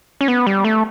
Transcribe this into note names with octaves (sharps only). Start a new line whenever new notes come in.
C#4
B3
G3
A3